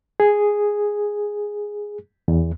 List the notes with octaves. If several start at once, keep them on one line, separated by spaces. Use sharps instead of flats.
G#4
E2